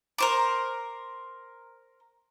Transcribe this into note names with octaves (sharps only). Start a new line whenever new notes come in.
A#4 C5 D6